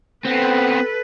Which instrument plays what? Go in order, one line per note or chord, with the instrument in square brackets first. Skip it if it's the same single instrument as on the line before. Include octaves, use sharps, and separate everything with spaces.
[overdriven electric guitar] B3 C4 [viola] A4 B4